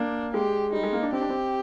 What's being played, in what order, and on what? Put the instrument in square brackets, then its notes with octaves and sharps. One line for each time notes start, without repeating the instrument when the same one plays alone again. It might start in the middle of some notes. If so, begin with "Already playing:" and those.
Already playing: [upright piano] A#3 [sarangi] D4
[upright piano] G#3 [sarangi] G4
[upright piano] G3 [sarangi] D#4
[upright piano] G#3
A#3
D4
[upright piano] C4 [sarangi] G4
[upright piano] D4
C4